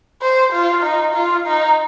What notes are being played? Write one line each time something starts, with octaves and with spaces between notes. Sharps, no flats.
C5
F4
D#4
F4
D#4